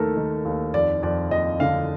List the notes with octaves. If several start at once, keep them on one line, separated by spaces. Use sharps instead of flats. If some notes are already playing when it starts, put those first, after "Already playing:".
Already playing: D#2 D#3 A3 A4 A#4
D#3
D#2
F2 D5
F2 D5
F2 D#5
D3 F5